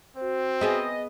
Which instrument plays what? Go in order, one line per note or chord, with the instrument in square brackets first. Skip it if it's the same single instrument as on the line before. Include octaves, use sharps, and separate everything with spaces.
[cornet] C4 [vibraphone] F#4 C5
[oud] B3 G#4 E5 [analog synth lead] D#5